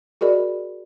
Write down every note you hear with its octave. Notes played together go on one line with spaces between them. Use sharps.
F#4 G#4 A#4 D5 D#5 B5